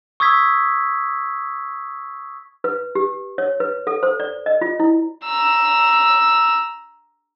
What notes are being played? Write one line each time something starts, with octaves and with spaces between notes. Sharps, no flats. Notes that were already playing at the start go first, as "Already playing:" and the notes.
C#6 D#6 E6 G#6 B6
B4
G4
C#5
B4
A4
C5
D5
D#5
F4
E4
A#5 E6